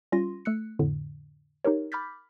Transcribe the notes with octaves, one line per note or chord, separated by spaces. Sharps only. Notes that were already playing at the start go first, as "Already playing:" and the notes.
G3 C#4 F4 C6 A#6 D#7
A3 E6 F#6 C#7
F2 A2 D3
D#4 G4 A#4 C#5
B5 D6 F6 G6 A6 B6